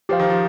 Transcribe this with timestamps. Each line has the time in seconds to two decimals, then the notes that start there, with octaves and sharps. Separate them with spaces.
0.09 F3 G4 C5 F5
0.20 D#3
0.30 F3